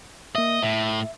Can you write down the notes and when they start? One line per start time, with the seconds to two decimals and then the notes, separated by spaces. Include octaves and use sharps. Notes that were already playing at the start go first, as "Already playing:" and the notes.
0.35 A#3 D#5 E5
0.63 A2 E5